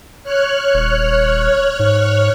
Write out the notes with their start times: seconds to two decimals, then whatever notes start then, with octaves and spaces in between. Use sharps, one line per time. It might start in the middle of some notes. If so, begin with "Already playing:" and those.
0.24 C#5 F6 F#6
0.74 D#1
1.79 G#2